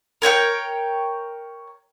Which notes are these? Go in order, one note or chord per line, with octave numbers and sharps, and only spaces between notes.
A#4 C#5 F#5 G5